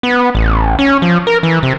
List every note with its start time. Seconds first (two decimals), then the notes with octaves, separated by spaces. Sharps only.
0.03 B3
0.35 A1
0.79 C#4
1.02 F3
1.27 A#4
1.43 E3
1.63 C3